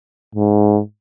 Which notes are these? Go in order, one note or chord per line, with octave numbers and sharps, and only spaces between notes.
G#2